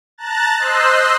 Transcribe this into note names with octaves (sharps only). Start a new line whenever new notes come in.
A5 A#5 F#6 A6
C5 D#5 C6 E6 F#6